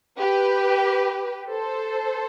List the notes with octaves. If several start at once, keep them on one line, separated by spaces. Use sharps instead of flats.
G4 B4
A4 C5